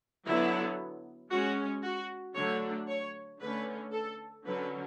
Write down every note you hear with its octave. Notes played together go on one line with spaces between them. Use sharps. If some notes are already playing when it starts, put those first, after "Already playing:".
D3 F#3 B3 E4
G#3 C#4 F#4
F#4
D3 F#3 A3 D4 C#5
C#5
D3 A3 C#4 B4
A4
D3 F#3 C#4 B4